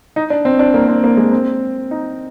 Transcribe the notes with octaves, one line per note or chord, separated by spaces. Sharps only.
D#4
D4
C4
D4
A#3
C4
A#3
G#3
C4
D#4